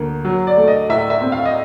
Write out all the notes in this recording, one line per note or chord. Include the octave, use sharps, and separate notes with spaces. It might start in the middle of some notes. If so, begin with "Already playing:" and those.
Already playing: D2 A#3
F#3
D5
A3
D#5
A2 E5
E5
C4
F5
D#5